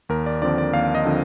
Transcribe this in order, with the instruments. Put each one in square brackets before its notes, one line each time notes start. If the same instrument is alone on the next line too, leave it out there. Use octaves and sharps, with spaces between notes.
[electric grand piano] D#2 A#4
D5
D3 F3 C4 D5
D5
D#2 F5
D#5
D3 F3 C4